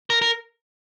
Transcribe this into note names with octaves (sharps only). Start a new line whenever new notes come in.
A#4
A#4